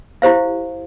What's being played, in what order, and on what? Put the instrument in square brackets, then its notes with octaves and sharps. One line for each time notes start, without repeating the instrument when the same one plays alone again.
[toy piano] E4 G4 C5 F5